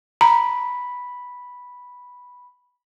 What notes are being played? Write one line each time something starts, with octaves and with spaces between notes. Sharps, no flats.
A#5 B5